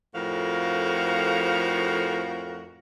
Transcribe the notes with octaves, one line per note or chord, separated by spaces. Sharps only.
F2 A2 F3 F#4 A#4 F5